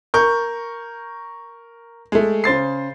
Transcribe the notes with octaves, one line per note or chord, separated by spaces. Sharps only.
A#4 C#6 G6
G#3 A3
C#3 C5 A6 C7